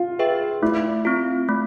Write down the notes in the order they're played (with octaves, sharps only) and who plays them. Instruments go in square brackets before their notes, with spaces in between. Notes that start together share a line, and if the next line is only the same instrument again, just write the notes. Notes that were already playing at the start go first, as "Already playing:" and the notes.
Already playing: [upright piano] F4
[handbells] G#4 B4 E5 G5
[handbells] A3 [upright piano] E4
[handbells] C4 F4
A3